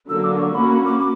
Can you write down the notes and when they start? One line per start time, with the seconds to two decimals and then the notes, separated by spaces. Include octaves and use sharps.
0.09 D3 F#3 A#3 E6
0.24 D6
0.39 C#6
0.54 A#3 C#4 F#4 B5
0.70 B5
0.85 D6
1.00 D6